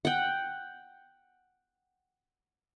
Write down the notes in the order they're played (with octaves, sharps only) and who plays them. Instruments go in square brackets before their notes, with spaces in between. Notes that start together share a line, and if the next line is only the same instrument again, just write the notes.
[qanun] F#5 G5